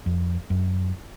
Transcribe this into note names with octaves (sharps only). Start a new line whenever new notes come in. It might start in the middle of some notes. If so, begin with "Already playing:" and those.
F2
F#2